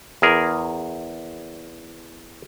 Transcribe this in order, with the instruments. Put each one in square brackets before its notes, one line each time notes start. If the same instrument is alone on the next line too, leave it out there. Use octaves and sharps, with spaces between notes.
[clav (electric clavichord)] E2 G#4 A#4